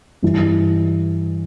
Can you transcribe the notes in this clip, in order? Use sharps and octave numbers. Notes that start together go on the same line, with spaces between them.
G2 E3